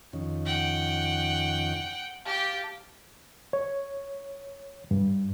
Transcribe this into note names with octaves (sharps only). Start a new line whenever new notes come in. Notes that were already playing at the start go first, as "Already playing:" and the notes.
F2 D#3 C#4
F#5 G5
G4 F5 G5 A5
C#5
G2